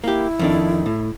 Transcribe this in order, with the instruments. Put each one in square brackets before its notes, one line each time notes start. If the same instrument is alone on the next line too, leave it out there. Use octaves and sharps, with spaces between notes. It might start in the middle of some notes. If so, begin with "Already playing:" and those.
[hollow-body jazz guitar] A#3 G4 [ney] E4
[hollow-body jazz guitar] F2 D#3 D4
A2